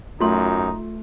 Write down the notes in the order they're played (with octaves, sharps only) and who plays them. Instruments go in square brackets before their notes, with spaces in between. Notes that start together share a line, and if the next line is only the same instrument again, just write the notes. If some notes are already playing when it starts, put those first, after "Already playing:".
[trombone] F#2 [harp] A3 [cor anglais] D#4 [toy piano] F4 C6